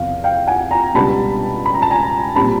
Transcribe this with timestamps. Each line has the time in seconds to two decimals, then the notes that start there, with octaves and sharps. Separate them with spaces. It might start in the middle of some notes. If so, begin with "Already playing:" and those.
Already playing: E2 C3 F3 F5
0.24 F5 G5
0.47 F#5 G#5
0.71 G#5 A#5
0.94 C#2 B2 G3 B3 D4 A5 B5
1.66 B5
1.74 A#5
1.82 A5
1.91 G#5 A#5
2.35 A#2 G3 C4 A5 B5